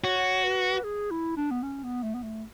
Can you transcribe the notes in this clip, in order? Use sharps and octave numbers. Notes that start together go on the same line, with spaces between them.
F#4 C#5
B4
G#4
E4
D4
B3
C#4
B3
A3
B3
A3